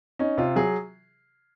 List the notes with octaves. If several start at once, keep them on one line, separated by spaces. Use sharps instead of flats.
C#4 D#4
C3 F4
F#3 G#4